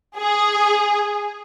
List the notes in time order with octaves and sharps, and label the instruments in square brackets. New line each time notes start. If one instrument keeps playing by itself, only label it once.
[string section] G#4